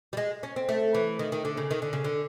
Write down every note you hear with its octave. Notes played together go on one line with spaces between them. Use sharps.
G3
G#3
C#4
C4
A3
E3
D#3
D#3
D3
C#3
D#3
D3
C#3
D3